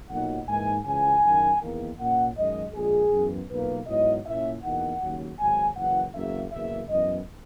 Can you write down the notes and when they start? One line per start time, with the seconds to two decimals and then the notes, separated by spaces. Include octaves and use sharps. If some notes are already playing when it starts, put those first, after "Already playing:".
0.09 B1 A#2 F#3 A#3 D#4 F#5
0.47 G#2 E3 A#3 D#4 G#5
0.85 C#2 C#3 E3 G#5
1.23 F#1 F#2 D#3 A#3
1.60 E2 D#3 A#3
1.98 A#2 A#3 C#4 F#5
2.35 F#2 D#3 G#3 D#5
2.74 A#1 A#2 G#3 G#4
3.11 F#2 E3 B3
3.49 B1 A#2 A#3 B4
3.87 G#2 F#3 B3 E4 D#5
4.25 A#2 A#3 C#4 E4 E5
4.62 E2 B2 A#3 D#4 F#5
5.00 D#2 C#3 F#3
5.38 G#1 G#2 F#3 G#5
5.76 F#1 F#2 E3 F#5
6.13 F#1 E2 C#3 F#3 A#3 E5
6.52 F#1 E2 B2 A#3 E5
6.89 F#2 E3 B3 D#5